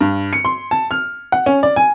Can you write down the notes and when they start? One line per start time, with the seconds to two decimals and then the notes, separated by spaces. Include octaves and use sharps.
0.01 G2
0.33 C#7
0.45 C6
0.71 A5
0.91 F6
1.32 F#5
1.46 C#4
1.63 D5
1.76 G#5